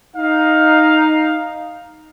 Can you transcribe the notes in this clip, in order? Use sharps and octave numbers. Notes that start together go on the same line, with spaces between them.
D#4 F5